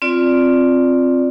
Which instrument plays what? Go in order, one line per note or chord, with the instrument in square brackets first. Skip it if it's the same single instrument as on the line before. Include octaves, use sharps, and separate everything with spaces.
[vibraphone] C4 F4 D5